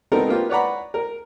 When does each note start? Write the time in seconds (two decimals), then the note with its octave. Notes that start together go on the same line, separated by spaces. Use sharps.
0.12 B3 C4 D#4 A4 A#4 C5
0.28 A#3 B3 F4 G4 C5
0.50 B4 C#5 D5 F#5 A#5 B5
0.94 A#4